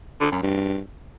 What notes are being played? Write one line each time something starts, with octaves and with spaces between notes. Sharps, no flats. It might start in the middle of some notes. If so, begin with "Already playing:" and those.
D3
F#2
G2